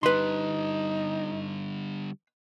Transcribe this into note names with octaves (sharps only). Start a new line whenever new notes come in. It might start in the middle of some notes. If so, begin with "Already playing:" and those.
D3 G3 D#4 B4 C6